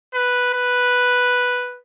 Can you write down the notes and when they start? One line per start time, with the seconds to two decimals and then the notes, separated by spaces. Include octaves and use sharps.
0.14 B4
0.53 B4